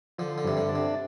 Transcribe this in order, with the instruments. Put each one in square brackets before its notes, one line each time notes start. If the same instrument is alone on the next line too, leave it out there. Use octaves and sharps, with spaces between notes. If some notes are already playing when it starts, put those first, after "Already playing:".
[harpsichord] D3 [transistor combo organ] F3
[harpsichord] D3
[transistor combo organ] G2 [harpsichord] C3
[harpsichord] D3
[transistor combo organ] D4
[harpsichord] C3